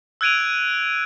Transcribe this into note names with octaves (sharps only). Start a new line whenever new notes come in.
E6 F#6 G#6 D7 D#7 F7